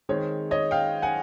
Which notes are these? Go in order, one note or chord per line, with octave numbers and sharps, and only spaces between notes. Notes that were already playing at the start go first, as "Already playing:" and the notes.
D#3 G#3 C4 C#5
C#5 D#5
F5 G5
F#5 G#5